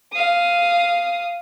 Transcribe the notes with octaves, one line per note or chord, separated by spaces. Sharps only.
F5 D#6